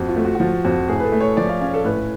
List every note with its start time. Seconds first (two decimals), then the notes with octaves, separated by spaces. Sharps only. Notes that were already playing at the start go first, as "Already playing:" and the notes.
Already playing: F2 F#4
0.09 F4
0.16 A3
0.25 F#4
0.35 F#4
0.40 F3 F4
0.64 F2 F#4
0.88 A2 G#4
1.00 B4
1.04 A4
1.12 A3
1.20 C#5
1.37 F3 D5
1.49 F5
1.60 C#4 F5
1.74 A4
1.84 A2 B4